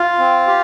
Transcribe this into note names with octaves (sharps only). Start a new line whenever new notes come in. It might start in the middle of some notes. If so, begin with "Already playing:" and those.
Already playing: F4 F5
C4
G4